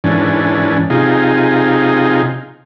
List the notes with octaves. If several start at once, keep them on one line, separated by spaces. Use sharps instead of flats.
G#2 E3 C#4 D4
C3 D#4 F4 G#4